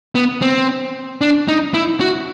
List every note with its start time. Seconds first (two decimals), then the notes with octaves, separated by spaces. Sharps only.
0.15 B3
0.42 C4
1.21 D4
1.48 D#4
1.74 E4
2.01 F#4